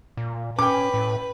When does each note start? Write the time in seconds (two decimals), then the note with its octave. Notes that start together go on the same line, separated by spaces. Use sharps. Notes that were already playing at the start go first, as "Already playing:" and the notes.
0.17 A#2
0.59 C#4 B4 G5 D6
0.94 A2